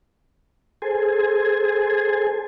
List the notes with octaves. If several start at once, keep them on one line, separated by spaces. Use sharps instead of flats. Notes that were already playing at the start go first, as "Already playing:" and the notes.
G#4 A4 C5 G#5